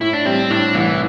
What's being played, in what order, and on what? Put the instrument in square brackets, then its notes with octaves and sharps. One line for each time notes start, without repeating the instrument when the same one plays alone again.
[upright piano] A2 [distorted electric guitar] E4
[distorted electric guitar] D4
[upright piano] G3 [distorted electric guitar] C4
[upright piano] A2 [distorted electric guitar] D4
[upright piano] C2 [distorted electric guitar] E3